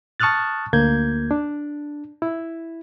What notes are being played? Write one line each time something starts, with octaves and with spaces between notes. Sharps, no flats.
A5 C#6 D#6 F6 F#6 A6
D2 A#3 G6 G#6
D4
E4